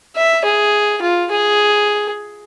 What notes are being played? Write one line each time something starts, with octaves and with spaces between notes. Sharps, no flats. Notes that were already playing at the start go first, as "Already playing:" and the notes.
E5
G#4
F4
G#4